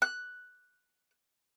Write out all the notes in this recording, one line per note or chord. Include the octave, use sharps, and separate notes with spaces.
F#6